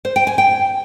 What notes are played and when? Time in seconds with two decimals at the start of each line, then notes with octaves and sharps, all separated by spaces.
0.05 C5
0.16 G5
0.27 G#5
0.38 G5